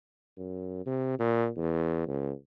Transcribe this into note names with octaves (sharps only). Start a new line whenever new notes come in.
F#2
C3
A#2
E2
C#2